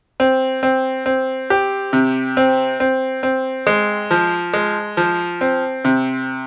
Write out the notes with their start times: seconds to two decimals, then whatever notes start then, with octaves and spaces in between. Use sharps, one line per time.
0.20 C4
0.63 C4
1.06 C4
1.50 G4
1.93 C3
2.37 C4
2.80 C4
3.23 C4
3.67 G#3
4.11 F3
4.54 G#3
4.97 F3
5.41 C4
5.85 C3